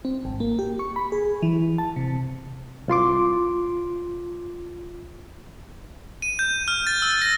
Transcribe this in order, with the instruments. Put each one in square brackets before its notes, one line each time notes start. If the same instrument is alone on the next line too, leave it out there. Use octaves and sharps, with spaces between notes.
[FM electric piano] C4
G#1
A#3
G4
C#6
B5
G#4
E3
A5
C3
[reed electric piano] C2 F4 C6 D6
[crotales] D#7
G6
F6
A6
E6
A#6